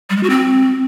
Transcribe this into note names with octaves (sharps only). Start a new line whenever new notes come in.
G3
G#3
F#4
C4